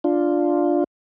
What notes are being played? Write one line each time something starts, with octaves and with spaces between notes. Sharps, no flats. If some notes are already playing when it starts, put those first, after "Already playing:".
D4 F4